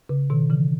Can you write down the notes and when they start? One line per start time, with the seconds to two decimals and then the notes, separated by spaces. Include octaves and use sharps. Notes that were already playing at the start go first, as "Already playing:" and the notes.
0.09 C#3
0.30 B2 D#3
0.50 C#3 E3